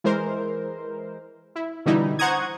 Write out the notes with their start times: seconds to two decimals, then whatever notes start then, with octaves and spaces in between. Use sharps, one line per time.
0.04 E3 G#3 A#4 C5
1.56 E4
1.86 B2 D3 E3 G3 D#4 E4
2.19 C5 F#5 A#5 C#6 D#6 G#6